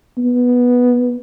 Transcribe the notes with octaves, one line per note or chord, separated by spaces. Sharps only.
B3